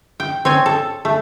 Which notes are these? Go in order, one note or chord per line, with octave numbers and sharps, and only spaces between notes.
G5
C4 C#5 G#5
A4
A3